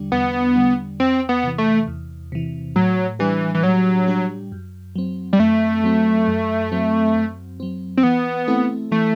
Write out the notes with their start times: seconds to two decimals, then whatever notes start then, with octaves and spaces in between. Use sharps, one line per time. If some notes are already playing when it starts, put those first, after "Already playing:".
Already playing: E2 D3 G3 D4
0.12 E2 B3
0.55 D3 G3 D4
1.00 E2 C4
1.29 B3
1.44 C3 E3
1.58 A3
1.88 E2
2.32 C3 E3
2.76 A2 F#3
3.19 E3 G3 D4 G4
3.55 E3
3.63 A2 F#3
4.08 G3 D4 G4
4.52 F#2
4.96 F#3 C4
5.33 G3
5.40 F#2 A3
5.84 F#3 C4
6.28 F#2
6.72 F#3 C4
7.16 F#2
7.60 F#3 C4
7.97 C4
8.03 E3 B3
8.48 A3 C4 E4 A4
8.91 E3 A3